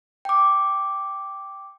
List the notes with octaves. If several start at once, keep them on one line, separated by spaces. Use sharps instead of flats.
G5 D6